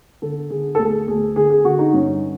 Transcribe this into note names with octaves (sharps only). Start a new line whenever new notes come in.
D3 A4
D3 G#4
A4
D2 G#4
D2 G#4
D3 G#4
G#4
D3 F#4
D#4
G2 C#4